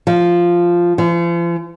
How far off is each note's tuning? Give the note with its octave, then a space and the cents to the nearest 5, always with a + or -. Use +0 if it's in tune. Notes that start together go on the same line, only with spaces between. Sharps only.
F3 -5
F3 -40